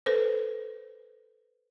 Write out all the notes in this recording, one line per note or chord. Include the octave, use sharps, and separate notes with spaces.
A4 B4 C5